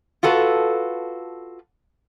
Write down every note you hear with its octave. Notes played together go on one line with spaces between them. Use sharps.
F4 F#4 A4 B4